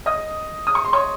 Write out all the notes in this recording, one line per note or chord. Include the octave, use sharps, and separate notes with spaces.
D#5 D#6
D#6
C#6
C6
C#5 C#6